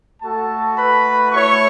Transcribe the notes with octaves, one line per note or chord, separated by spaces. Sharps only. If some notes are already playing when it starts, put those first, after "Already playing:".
A3 F#4 A4 A5
B4 B5
A3 E4 C#5 C#6